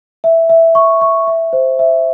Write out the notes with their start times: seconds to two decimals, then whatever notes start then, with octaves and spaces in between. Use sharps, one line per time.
0.24 E5
0.49 E5
0.75 C#6
1.01 C#6
1.27 E5
1.53 C5
1.79 E5